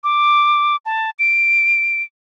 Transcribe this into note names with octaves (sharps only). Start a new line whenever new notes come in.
D6
A5
D7